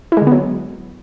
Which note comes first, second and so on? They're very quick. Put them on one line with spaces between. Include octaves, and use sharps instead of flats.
E4 G#3 D3 B3 F#3